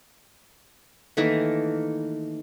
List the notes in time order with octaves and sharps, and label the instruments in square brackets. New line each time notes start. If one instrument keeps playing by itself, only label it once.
[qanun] D#3 E3 A3 A#3